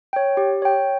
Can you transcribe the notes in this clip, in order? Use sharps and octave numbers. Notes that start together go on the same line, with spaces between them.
C#5 G5
G4
C#5 G5